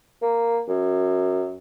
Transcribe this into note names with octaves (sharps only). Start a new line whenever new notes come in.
A#3
F#2